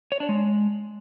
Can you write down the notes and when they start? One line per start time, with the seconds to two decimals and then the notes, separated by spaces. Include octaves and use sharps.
0.12 C#5
0.20 D4
0.29 G#3